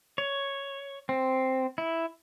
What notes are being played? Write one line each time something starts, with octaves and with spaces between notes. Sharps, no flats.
C#5
C4
E4